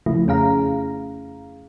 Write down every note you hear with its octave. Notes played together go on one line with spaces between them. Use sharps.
C#3 F3 A3 E4
F2 C#4 G#4 F5 A#5